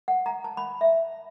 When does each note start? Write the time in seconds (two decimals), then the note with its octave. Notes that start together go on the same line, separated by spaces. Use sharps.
0.08 F#5
0.26 A#5
0.44 A5
0.57 B5
0.81 E5